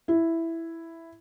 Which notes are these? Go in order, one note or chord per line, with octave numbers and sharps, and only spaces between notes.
E4